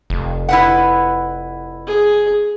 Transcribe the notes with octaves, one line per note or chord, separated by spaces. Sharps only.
F1
E4 B4 F#5
G#4